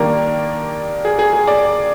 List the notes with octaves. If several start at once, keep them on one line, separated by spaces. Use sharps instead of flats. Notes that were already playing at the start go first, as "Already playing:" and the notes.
Already playing: D#3 G3 A#3 D4 A#4
G#4
G#4
G#4
D5